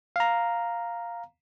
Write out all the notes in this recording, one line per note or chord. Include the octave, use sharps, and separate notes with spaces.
F5 A#5